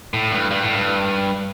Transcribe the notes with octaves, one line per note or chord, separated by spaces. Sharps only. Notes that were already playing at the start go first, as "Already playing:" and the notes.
A2
G2
G2
A2
G2